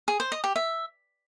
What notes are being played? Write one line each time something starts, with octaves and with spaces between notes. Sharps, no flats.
G#4
C5
D#5
G4
E5